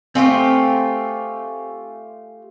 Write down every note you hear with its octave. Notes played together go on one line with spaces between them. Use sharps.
A3 C4 F4 G4 G#5 C6 C#6